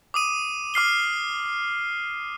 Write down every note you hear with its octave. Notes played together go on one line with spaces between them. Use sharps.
D6 D#6 D#7
D6 F6 C7 G7